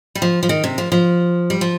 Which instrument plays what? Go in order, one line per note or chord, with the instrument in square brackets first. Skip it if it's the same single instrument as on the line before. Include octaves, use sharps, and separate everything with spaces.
[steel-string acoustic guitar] G3
F3
F3
D#3
C3
F3
F3
G3
F3